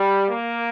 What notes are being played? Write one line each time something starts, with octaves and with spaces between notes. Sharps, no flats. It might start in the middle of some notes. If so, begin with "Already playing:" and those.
Already playing: G3
A#3